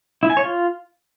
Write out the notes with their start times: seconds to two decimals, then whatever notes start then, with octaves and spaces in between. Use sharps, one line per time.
0.23 E4
0.30 G#5
0.37 C#5
0.44 F4